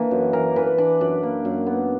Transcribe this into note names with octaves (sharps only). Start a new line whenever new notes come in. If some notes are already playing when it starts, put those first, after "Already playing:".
Already playing: E3 A#3 D4 A#4
F#2
E3 A#4
E3 B4
D4 D5
F#2 D5
A#3
F#2
B3